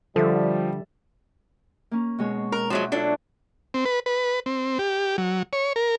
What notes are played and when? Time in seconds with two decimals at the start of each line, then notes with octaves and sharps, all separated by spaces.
0.16 D3 F3 G3 A4 E5
1.91 A#3 C#4
2.19 B2 G#3 C#5
2.52 A#4
2.70 F3 F#3 G#3 E4 F#4
2.92 F#3 D4 E4 F4 A4
3.74 C4
3.85 B4
4.06 B4
4.46 C4
4.79 G4
5.18 F#3
5.53 C#5
5.76 A#4